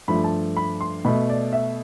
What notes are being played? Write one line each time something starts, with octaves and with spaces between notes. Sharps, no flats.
G2 F3 A3 B5
A5
B5
C6
B2 A3 B5
D5
E5